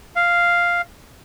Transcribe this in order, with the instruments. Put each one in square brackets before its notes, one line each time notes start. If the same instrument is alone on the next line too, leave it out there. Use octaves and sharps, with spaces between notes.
[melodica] F5